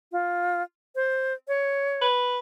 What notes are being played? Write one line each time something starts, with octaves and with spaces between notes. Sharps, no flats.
F4
C5
C#5
B4